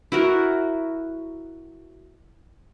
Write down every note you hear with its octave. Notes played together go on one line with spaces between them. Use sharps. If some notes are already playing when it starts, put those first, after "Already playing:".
E4 F#4 A#4